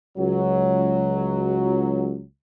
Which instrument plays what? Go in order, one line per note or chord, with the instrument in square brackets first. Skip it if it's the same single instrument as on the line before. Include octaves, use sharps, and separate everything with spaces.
[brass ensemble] C#2 F#3